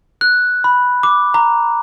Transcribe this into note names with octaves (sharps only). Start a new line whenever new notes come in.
F#6
B5
D6
A#5